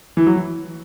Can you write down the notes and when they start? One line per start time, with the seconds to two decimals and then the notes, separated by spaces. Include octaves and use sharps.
0.17 E3
0.27 F#3
0.36 E3